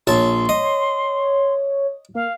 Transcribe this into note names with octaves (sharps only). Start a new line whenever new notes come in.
A#1 C#5 A5 C6
D#5
A#3 F5